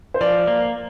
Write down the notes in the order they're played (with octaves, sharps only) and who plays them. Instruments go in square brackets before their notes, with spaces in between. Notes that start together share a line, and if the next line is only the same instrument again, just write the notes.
[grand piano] C5
[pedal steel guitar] F3 [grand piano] D5
[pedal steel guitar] A#3